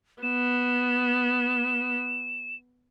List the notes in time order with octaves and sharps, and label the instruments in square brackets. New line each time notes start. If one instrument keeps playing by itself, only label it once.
[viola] B3 [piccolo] E7